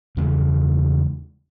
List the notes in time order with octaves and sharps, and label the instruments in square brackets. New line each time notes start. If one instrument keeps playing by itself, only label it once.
[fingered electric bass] E2 C#3 G#3